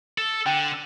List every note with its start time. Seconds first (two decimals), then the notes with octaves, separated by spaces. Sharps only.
0.18 A4
0.46 D3 G5